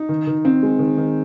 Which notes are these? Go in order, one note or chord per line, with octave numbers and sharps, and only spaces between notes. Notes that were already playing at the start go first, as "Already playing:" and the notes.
Already playing: D#4
D#3
D#3
C4
G#3
D#3
D#3